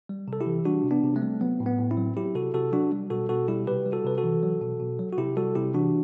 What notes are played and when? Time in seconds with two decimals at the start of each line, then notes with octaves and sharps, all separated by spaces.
0.09 G3
0.28 C3 A4
0.41 E4 G4
0.46 E3
0.65 G3 D4 F#4
0.84 C3
0.91 B3 D4
1.03 C3
1.16 A3 C4
1.22 G3
1.41 F#3 B3
1.60 A2
1.66 B3
1.79 A2
1.91 C4 E4
1.97 F#3
2.17 F#3 E4 G4
2.35 C3 F#4 A4
2.54 C3 F#4 A4
2.73 F#3 D4 F#4
2.92 G3
3.10 B2 F#4 A4
3.29 B2 F#4 A4
3.48 G3 E4 G4
3.67 C3 G4 B4
3.86 G3
3.92 F#4 A4
4.05 C3 B4
4.18 F#4 A4
4.24 E3
4.43 F#3
4.62 B2
4.80 B2
4.99 F#3
5.13 F#4
5.18 C3 E4 G4
5.37 G3 F#4 A4
5.55 C3 E4 G4
5.74 E3 D4 F#4